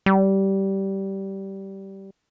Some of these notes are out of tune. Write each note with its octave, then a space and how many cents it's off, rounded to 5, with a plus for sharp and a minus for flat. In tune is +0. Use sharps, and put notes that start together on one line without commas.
G3 -15